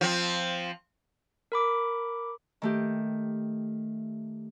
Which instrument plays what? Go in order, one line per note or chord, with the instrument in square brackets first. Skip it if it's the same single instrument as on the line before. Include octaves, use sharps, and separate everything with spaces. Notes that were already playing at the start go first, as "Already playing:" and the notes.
[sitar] F3 C4
[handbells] A#4 B5 D6
[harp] D#3 A3 G4